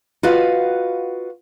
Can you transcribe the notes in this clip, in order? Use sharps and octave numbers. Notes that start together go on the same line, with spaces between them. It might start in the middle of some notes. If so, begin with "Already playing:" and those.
F4 F#4 B4 D#5 F5 F#5